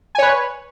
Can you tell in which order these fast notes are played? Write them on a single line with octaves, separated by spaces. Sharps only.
G#5 C#5 B4